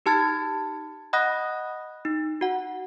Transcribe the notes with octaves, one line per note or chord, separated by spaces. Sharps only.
D#4 G4 A5 F6 G#6 A6
D#5 F#5 B5 D#6 F#6 A#6
D#4
F#4 F#5